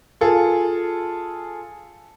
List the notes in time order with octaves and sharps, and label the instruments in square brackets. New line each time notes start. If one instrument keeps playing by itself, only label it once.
[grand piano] F4 G#4 A4